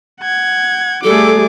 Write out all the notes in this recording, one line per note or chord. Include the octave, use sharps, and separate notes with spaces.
F#5 G#6
G3 A3 G#4 A4 D6